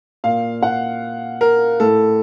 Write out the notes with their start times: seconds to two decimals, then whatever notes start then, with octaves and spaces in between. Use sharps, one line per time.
0.24 A#2 F5
0.63 F#5
1.41 A#4
1.80 A2 A4